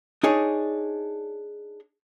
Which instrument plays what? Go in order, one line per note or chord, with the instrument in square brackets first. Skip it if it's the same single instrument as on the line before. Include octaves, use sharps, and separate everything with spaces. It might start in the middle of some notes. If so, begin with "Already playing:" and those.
[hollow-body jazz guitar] D4 D#4 G#4 C#5